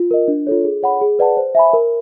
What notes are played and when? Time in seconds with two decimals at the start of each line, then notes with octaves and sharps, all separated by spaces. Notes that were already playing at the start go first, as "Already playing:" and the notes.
Already playing: F4
0.11 A#4 D#5
0.28 D4
0.47 F4 A4 C#5
0.65 G#4
0.83 C#5 F#5 B5
1.01 G#4
1.19 B4 D5 F#5 A5
1.37 C5
1.55 E5 G#5 B5
1.73 A#4